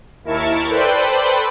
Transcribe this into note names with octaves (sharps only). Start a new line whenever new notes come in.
D#2 E4 A#4 A5 C#6
A4 B4 C5 D5 G5 B5